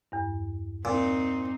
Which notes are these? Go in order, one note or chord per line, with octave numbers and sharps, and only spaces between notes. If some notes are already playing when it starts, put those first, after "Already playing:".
E2 G2
A#2 C4 D#4